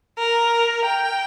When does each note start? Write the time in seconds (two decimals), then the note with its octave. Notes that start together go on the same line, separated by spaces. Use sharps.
0.19 A#4
0.85 G5